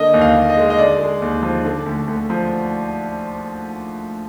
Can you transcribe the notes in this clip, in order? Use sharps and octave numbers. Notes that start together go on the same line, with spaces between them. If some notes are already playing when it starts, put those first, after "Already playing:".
Already playing: D3 A#3 D#5
D#2
F5
D#2
D#5
G#3
D#5
D3 D5
G#3
D#2
F3
D3
D2
D2
F3